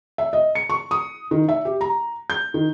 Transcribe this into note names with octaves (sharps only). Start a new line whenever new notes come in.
E5
D#5
C#7
C#6
D#6
D#3
E5
G4
A#5
G6
D#3